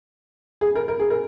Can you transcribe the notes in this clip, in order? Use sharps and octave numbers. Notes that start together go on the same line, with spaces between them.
G#4
A#4
A#4
G#4
A#4